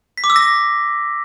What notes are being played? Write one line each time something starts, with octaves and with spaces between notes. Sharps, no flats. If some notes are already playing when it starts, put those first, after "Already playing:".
B6
D6
E6
A#6